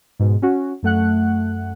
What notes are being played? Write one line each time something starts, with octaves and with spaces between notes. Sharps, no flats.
G#2 B2
C#4 F#4
F#2 A3 F#5 F#6